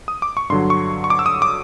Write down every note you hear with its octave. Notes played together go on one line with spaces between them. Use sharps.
D#6
D6
C#6
G2 D3 F#3 C6
C#6
C#6
D6
E6
D#6
D6